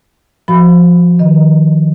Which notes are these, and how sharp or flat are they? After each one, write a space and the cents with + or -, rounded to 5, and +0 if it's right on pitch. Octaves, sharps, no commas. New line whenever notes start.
F3 +0 F#4 +0 B5 +15
D#3 -5 D#5 +0